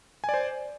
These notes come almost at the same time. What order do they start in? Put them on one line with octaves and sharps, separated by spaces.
G#5 D5 C5